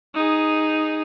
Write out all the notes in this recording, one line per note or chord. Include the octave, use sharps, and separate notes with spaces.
D#4 G#4